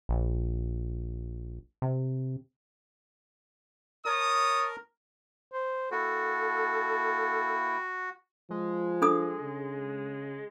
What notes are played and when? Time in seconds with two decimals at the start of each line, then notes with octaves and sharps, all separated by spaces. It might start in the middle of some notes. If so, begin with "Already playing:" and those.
0.09 A#1
1.82 C3
4.06 A#4 C#5 A5 D#6
5.52 C5
5.91 A#3 E4 F#4 A4 G5
8.50 F3 G#3
9.02 D4 A4 D#6
9.43 C#3